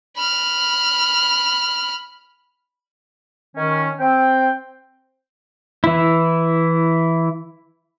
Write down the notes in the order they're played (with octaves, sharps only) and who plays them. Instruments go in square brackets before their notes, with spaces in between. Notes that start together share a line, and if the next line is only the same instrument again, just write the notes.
[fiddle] B5 F6
[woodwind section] D#3 C#4
C4 G5
[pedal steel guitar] E3 E4